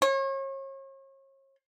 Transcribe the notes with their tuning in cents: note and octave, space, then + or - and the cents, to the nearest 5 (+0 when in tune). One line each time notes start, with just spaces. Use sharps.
C#5 -40